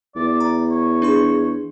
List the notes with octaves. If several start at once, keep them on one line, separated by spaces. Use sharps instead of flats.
E2 D5
A#5
C#5
D4 G#4 C6